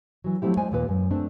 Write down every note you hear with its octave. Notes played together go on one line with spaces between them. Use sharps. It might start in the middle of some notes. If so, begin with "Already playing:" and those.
E3 F#3
F3 F#3 A3 C4 E4 G4
G#3 C5 D5 G#5
D#2 A#2 B4
F#2
A3 C4 D4